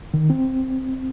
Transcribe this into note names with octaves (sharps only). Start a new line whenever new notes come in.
D#3
C4